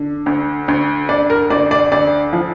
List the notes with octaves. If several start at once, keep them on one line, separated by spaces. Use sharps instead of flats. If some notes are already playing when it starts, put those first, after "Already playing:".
Already playing: D3
D2
D2
D2 D5
A#4
D2 D5
D5
D2 D5
F3